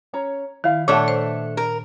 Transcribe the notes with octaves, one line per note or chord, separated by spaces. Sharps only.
C#4 C#5 A#5
D#3 E4 F5
A#2 A3 D4 A4 C#5 E5 F#5
C5
A#4